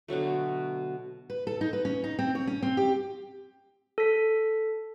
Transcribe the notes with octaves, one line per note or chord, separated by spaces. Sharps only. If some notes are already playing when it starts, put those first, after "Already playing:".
B2 D3 F#3 A3
B4
A4
D#4
B4
C#4
D#4
C4
C#5
C#4
C4
G4
A4 B6